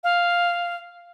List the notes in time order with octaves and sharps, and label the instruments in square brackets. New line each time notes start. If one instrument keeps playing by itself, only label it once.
[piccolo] F5